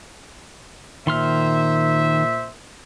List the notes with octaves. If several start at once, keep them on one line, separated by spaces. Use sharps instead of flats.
A#2 D#3 C5 E5 C6 F6